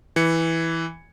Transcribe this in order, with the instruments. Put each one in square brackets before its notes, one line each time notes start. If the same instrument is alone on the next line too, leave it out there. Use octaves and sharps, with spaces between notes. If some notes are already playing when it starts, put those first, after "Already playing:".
[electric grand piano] E3 C#7